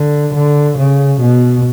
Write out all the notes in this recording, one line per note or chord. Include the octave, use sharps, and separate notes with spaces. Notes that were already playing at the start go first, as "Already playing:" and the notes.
Already playing: D3
D3
C#3
B2